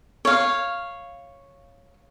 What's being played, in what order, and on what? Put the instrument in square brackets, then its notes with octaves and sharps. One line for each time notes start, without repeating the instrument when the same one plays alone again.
[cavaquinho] C#5 F5